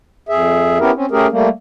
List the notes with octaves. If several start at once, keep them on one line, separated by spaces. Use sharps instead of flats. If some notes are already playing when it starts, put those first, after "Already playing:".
F2 G#4 E5
B3 C#4 E4 G4 A#4
C4 C#4
A3 C#4 G4 G#4 A#4
G3 A3 A#3